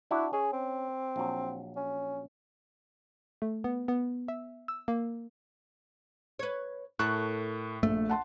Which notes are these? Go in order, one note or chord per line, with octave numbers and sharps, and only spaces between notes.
D4 E4 F#4
C#4 G#4
C4
A#1 F#3
C#4
A3
B3
B3
E5
E6
A#3
B4 C#5
A2 A4 A#4 C#6 F#6
A#1 A3
F#5 A5 C6